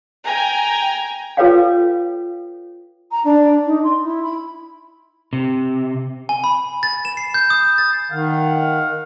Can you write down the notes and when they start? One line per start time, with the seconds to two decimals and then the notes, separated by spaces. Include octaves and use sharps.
0.23 G5 G#5 A#5
1.37 F4 A4 B4 C#5 F5 G5
3.11 A#5
3.24 D4
3.66 D#4
3.83 C6
4.03 E4
4.23 B5
5.33 C3
6.29 G#5
6.44 B5
6.83 A6
7.05 E7
7.17 C7
7.34 G6
7.50 D#6
7.78 A6
8.12 D#3 F5 F#5